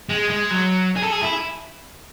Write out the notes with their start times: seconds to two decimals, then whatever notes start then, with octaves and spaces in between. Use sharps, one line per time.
0.09 G#3
0.30 G#3
0.50 F#3
0.96 G#4
1.02 A4
1.12 G#4
1.23 E4